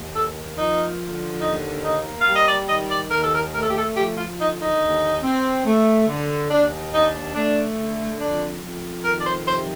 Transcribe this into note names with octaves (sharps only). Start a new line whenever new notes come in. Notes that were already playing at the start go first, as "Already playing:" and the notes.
Already playing: D#2
A#3 A4
F3 D#4
D3
D#2 D#4
A#3 D#4
G3 F5
D#5
D5
D#3 D#5
D5
D#2 A#4
A4
A#4
A3 A#4
A4
G4
A4
F3 G4
F4
D3 D#4
D#4
D#2
C4
A3
D3
D#2 D4
D4 D#4
A3 D4
D3
F2 D4
F2
D#3 A#4
D5
C5
C3 C5